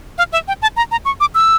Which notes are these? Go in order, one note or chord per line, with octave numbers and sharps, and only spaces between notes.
F5
E5
G5
A5
A#5
A#5
C#6
D6
E6